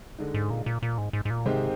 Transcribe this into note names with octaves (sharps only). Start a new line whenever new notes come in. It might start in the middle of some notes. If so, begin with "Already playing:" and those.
D3 G#3 D#4
G#2
A#2
A#2
A#2
G#2
G#2
G#2
A#2
G#2 C3 D#3 G#3 C4 G4